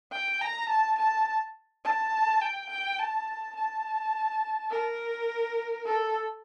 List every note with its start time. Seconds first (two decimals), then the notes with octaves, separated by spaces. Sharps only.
0.12 G5
0.41 A#5
0.69 A5
0.98 A5
1.84 A5
2.41 G5
2.70 G5
2.99 A5
3.57 A5
4.71 A#4
5.86 A4